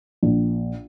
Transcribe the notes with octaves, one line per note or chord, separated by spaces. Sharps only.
A#1